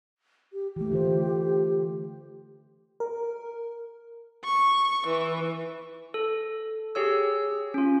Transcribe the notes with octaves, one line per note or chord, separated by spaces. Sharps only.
G4
E3 A3 G4
D3 F4 C5
A#4
C#6
E3
A4
G4 G#4 C#5 E6
C#4 F4